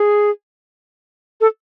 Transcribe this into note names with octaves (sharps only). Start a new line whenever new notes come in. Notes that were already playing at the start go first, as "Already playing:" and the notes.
Already playing: G#4
A4